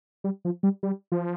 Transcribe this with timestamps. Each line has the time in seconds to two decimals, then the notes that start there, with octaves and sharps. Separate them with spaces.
0.24 G3
0.45 F3
0.63 G3
0.83 G3
1.12 F3